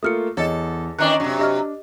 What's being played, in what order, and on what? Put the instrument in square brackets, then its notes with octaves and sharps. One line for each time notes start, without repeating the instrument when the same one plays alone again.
[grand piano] A3 A#3 F4 [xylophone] D#6 F6 C#7
[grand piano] E2 [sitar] A4 [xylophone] C#5 D#5
[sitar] D#3 E3 D4 [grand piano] C#4 D#5 A#5 [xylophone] D6 F#6
[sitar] C3 F#3 [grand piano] D4
[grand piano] D4 [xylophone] G4 D#5 F6